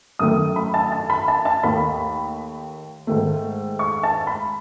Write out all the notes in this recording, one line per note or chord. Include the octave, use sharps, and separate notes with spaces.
F#2 D#3 A3 D#6
B5
A5
A5
B5
A5
A5
D#2 D#3 A3 B5
G#2 D#3 A3
C#6
A5
B5